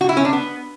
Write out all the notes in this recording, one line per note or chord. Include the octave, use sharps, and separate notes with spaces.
F#4
E4
C#4
D4
B3